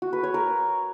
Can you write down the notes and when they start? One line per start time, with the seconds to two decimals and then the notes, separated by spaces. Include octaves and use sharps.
0.02 F#4
0.13 B4
0.23 C#5
0.34 A#4